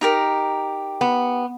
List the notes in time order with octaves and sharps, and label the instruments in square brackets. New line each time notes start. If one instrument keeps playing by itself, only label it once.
[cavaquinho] D#4 G4 A#4
[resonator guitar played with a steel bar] B3